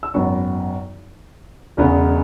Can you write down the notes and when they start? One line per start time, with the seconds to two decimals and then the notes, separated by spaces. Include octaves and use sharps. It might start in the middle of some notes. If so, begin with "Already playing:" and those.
0.03 E6
0.14 G#1 F#2 F#3 B3 C#6
1.77 E1 E2 C#3 G#3 B3